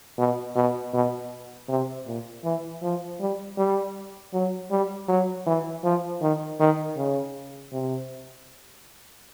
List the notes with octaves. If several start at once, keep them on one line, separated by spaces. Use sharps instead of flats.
B2
B2
B2
C3
A#2
E3
F3
G3
G3
F#3
G3
F#3
E3
F3
D#3
D#3
C#3
C3